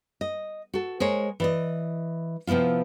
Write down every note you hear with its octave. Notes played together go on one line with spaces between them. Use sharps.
D#5
F#4 A4
G#3 A#4 C5 C#5
E3 D5 D#5
C3 F3 B3 E4 F4